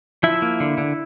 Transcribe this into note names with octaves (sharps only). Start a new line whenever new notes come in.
F3 E4 E5
A#3
D3
D3